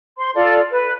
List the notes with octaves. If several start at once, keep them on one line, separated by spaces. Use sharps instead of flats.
C5 C6
F4 A4 D5
B4